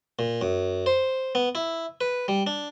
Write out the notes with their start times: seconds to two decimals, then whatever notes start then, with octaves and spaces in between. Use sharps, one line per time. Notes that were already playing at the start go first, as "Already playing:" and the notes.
0.19 A#2
0.41 F#2
0.86 C5
1.35 B3
1.55 E4
2.01 B4
2.28 G3
2.47 D4